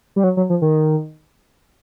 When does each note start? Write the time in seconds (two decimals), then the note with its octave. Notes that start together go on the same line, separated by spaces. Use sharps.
0.16 G3
0.24 F#3
0.37 F#3
0.50 F3
0.62 D#3